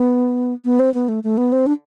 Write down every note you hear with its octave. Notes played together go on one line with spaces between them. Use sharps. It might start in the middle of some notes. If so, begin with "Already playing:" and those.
Already playing: B3
B3
C4
B3
A3
A3
B3
C4
D4